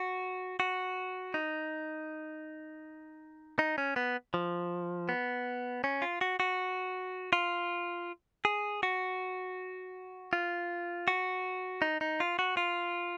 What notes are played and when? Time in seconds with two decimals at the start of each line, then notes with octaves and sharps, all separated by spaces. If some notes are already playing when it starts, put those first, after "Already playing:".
Already playing: F#4
0.60 F#4
1.34 D#4
3.59 D#4
3.78 C#4
3.96 B3
4.34 F3
5.09 B3
5.84 C#4
6.02 F4
6.21 F#4
6.40 F#4
7.33 F4
8.45 G#4
8.83 F#4
10.33 F4
11.08 F#4
11.82 D#4
12.01 D#4
12.20 F4
12.39 F#4
12.57 F4